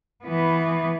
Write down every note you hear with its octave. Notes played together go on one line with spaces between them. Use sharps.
E3 B3